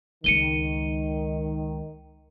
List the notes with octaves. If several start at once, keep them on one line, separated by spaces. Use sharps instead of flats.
C#2 D#3 G#3 C#7 D#7 G7